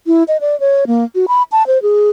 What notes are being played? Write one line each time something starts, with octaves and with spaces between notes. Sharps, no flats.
E4
D#5
D5
C#5
A#3
F#4
B5
A5
C5
G#4